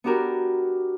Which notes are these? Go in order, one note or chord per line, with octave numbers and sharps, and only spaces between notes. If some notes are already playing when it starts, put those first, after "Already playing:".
B3 D4 F#4 G4 A#4